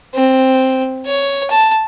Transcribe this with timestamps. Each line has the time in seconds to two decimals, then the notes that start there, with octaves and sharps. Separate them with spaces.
0.15 C4
1.06 C#5
1.50 A5